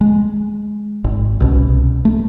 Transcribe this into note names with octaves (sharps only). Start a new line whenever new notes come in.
G#3
G#1
C2 B2 C#4
A3